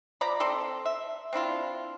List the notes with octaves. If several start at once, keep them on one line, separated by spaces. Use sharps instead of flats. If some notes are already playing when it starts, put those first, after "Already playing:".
F3 D5 A#5 B5
C4 A4 D5 C6
E5
C4 D4 E4 F4